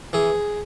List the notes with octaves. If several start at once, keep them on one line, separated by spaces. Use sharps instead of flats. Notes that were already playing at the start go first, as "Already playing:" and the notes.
E3 G#4